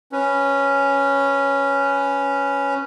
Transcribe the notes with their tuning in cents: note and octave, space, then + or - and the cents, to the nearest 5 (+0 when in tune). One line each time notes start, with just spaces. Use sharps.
C#4 +0 B4 +0